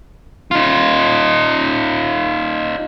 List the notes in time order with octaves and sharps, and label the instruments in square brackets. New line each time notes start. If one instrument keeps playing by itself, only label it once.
[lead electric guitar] D#4 F4